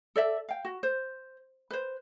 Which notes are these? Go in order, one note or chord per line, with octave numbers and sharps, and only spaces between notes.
A4 D5 E5
F5 G5
F#4
C5
B4 C5